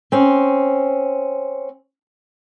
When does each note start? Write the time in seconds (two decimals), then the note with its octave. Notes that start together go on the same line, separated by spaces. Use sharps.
0.12 C4 C#4